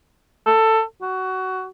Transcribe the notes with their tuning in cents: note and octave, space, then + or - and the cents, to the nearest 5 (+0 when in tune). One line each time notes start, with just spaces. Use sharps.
A4 +15
F#4 +20